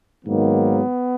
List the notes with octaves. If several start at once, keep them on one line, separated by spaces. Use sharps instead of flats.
G#2 D#3 F#3 A#3 B3